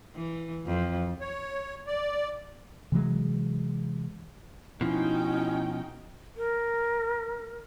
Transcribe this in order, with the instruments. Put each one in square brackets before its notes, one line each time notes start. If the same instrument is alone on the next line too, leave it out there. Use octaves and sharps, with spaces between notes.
[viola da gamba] E3
F2
[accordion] C#5
D5
[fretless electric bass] C3 E3 F#3 G#3
[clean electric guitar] B2 F3 [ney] C#4 [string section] D#4 F#4 G5 [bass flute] E4
[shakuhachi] A#4